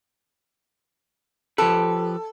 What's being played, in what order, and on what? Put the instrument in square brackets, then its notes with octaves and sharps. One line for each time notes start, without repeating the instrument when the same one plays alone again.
[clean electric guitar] F3 G4 B4 [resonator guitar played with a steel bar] A4